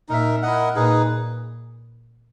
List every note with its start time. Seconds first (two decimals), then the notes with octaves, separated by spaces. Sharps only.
0.09 A#2 D#4 A#4 E5
0.42 E4 A#4 D#5 F#5
0.76 A#2 D#4 G#4 B4